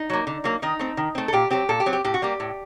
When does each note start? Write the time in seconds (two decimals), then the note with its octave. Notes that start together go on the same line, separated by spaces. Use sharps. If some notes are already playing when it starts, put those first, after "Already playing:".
Already playing: D#4
0.10 F#3 A#3
0.27 D3
0.44 F#3 A#3
0.62 D#3 D#4
0.79 A3 C4
0.97 D#3
1.15 A3 C4
1.28 A4
1.33 A#2 G4
1.50 F#3 C4 G4
1.69 A#2 A4
1.80 G4
1.86 F#3 C4
1.93 G4
2.04 A2 G4
2.14 F#4
2.22 G3 A#3 G4
2.40 A2